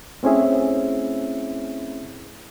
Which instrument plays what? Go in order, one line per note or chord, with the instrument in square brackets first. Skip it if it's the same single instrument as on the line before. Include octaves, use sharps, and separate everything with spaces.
[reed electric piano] A3 C4 C#4 E4 G#4 E5